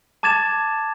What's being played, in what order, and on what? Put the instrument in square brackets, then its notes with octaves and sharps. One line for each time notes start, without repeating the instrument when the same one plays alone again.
[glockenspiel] A5 D6 G#6 A6 E7